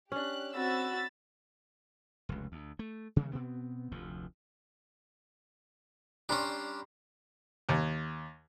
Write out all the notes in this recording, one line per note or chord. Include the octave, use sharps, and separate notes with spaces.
C#4 D4 G4 F#6
C4 F#4 B5 E6 A6
F1 C#2
D2
A3
C3 D#3 G3 A#3
B2 B3 C4
F1 D2 F3
G3 C#4 D4 A#5 C6
D#2